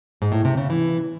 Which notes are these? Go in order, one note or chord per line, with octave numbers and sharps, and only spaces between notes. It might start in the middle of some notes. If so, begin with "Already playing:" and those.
G#2
A2
C3
C#3
E3